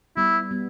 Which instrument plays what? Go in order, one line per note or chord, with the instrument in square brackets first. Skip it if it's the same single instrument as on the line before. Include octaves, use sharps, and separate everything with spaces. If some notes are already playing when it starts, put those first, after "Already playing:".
[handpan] G3 B3 [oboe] E4
[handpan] G3 B3